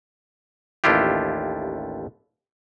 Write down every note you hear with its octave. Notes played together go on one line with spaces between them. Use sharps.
A1 D#2 D4 E4 F4 G4